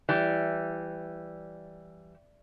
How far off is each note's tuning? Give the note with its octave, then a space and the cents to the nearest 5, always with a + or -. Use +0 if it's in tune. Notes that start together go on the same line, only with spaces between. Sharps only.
E3 +15 G3 +0